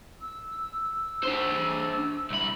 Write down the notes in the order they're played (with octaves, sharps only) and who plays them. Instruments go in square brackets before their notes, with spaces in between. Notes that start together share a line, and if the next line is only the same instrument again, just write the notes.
[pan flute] E6
[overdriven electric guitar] D4 C5
[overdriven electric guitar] C2 B5 [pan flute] E5